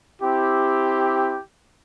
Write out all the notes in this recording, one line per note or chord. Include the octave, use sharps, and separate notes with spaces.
C4 E4 G4